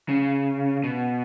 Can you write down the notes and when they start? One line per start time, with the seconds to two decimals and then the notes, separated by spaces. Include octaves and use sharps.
0.09 C#3
0.84 B2